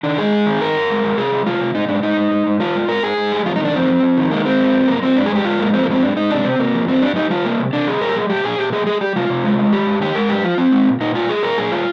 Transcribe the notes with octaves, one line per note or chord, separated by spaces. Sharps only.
D#3 D4
G#3 G#4
G#2
D#3
G2 A#4
G2
G#3
G2
C3 G#4
G3
C3 F4
C3
G#2 D#4
G#2 D4
G#2 D#4
G#2
G#2
G#2
G3 F4
G#2
G#2 A#4
G#2 G#4
G#2
G3
F2 F4
D#4
D#3 D4
F2 C4
F2
F2
D#3
G#3 A#3
G#3 C4
G2
G2
G2 A#3
G2 C4
G#2 D4
G#4
G#3 G4
G#2 F4
G#3 A#3
F3 C4
A#3
G#2 C4
G#2 D4
G#2 D#4
C3 D4
C3 C4
C3 A#3
F3
G2 C4
G3 D4
G3 D#4
G3 F4
C3 A#3
C3
C3 D4
G3 G#4
A#2 A#4
G4
G3 G#4
A#2 G4
A#2 G#4
A#2 G4
G3 G#4
G3 G#4
G3 G4
C3 F4
C3
G#3
G#3
D#3 G4
G#2
D#3 G4
G#3 A#4
G#2 G4
F3 F4
F3 C4
G#3
A#2
A#2 D#4
G3 F4
G3 G#4
A#2 A#4
A#2 G#4
G3 F4